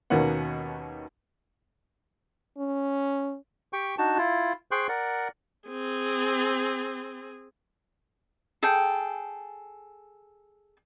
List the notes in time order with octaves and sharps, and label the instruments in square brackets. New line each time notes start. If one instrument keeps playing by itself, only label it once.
[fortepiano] D#2 B2 D#3 A#3 C#4 F#5
[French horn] C#4
[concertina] G4 G5 C#6
D4 D#4 F#4 A5
E4 F4
G#4 C5 G5 C6 C#6 F#6
A#4 D5 F#5
[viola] C4 G#4
[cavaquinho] G#4 A4 G5